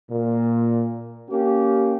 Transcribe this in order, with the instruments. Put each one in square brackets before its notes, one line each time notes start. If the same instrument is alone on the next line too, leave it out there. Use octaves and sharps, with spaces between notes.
[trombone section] A#2
A#3 C#4 G4